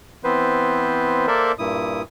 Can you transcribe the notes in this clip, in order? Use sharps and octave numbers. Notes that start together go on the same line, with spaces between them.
E3 B3 C4 B4 C5
A#3 A4 A#4 C5 D5 E5
G2 A#2 E4 D#6